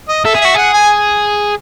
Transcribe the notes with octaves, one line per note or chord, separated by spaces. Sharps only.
D#5
A4 E5
G#4
F#4 E5
G#4 F#5
G#5